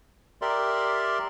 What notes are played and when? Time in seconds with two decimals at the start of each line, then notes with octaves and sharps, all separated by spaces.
0.42 G4 A#4 D5 E5 C6